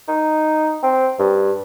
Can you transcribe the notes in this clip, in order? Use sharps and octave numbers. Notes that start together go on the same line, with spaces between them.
D#4
C4
G2